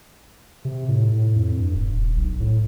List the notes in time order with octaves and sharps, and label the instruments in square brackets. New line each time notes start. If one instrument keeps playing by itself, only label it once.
[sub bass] C3
A2
A2
F2
G2
D#1
B1
A2